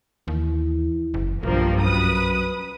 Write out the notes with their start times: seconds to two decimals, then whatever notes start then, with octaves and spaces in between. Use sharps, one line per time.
0.28 D#2 E3
1.14 F#1
1.43 B1 G2 F3 A#3
1.82 F#2 B4 D#6